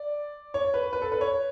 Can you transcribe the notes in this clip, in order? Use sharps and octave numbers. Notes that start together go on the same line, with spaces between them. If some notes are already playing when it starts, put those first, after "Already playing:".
Already playing: D5
C#5
B4
B4
A4
B4
C#5